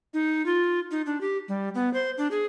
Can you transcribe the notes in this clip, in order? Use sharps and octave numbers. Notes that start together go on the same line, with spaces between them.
D#4
F4
D#4
D4
G4
G3
B3
C5
D4
G#4